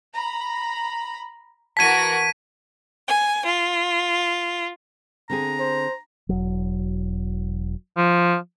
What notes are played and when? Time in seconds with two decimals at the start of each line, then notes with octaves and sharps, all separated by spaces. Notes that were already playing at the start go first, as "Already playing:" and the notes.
0.14 A#5 B5
1.77 E3 F#4 A#4 A5 G#6 B6 D7 D#7
3.08 G#5
3.45 F4
5.30 D3 C4 G#4 A#5
5.59 C5
6.29 E1 F#3
7.97 F3